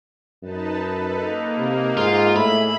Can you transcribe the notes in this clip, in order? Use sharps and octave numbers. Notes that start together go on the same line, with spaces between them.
F#2 D#4 B4 A5
A4 B4
A#3 D#4
C3
G#2 F4
A2 G#4 E5 B5